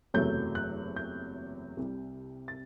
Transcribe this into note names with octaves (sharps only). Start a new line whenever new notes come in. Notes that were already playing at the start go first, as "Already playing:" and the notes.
F#1 E2 C3 F#3 A3 G6
F#6
G6
C2 C3 G3
A6